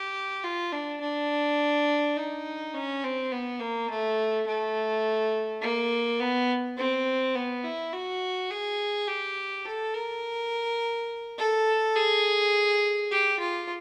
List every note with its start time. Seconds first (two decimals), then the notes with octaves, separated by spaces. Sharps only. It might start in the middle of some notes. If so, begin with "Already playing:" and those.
Already playing: G4
0.44 F4
0.72 D4
1.01 D4
2.17 D#4
2.74 C#4
3.03 C4
3.32 B3
3.60 A#3
3.90 A3
4.47 A3
5.62 A#3
6.20 B3
6.77 C4
7.35 B3
7.64 E4
7.93 F#4
8.51 G#4
9.08 G4
9.65 A4
9.94 A#4
11.38 A4
11.96 G#4
13.11 G4
13.40 F4